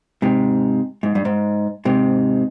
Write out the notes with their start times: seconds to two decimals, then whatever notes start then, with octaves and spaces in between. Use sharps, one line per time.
0.22 G#2 C3
1.03 G#2
1.15 G2
1.25 G#2
1.85 G#2 C3